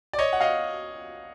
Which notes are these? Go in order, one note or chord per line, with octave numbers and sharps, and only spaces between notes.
D5
C#5 D#5
F#5
D#5 F5